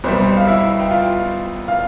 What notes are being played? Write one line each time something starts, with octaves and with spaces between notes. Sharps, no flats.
C2 B2 G3 C5
F5
E4 E5
G5
F4 F5
F5